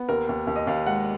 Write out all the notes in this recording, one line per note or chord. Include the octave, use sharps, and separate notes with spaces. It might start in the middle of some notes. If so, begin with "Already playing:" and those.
Already playing: B3
D#2 A#4
D#2
D#2
D#5
D#2 F5
G#3 F#5